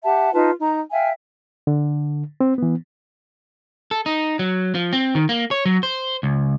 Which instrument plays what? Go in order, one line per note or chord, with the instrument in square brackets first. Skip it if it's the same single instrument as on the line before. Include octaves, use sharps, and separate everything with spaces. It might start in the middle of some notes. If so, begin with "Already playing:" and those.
[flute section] G4 E5 F#5 A5
D#4 F4 B4 A5
D#4 A#5
E5 F5 G5 G#5
[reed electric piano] D3
C4
E3 B3
[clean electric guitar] A4
D#4
F#3
F3
C4
D#3
A#3
C#5
F#3
C5
C#2